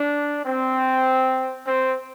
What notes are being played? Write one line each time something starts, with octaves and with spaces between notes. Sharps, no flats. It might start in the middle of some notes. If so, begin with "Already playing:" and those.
Already playing: D4
C4
C4